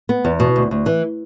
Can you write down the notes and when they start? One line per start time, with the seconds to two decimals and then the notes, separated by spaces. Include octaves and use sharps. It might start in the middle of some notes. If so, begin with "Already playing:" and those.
0.09 B3
0.25 E2
0.40 B2
0.56 D2
0.71 D2
0.86 E3